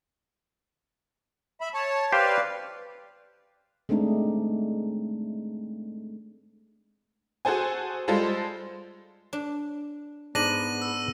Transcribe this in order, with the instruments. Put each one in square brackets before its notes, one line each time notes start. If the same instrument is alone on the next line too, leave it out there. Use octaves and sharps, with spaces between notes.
[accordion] E5 B5
C#5 A5
[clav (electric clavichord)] G4 C5 [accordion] B4 D5 F5
[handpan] G#3 A3 C4 D4 D#4
[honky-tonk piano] F#4 G#4 A4 C5 G#5
G3 G#3 F4 A4 C5
[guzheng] D4
[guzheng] G#2 [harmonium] B3 [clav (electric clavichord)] D4 [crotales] A#6 D#7 F#7
[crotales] E6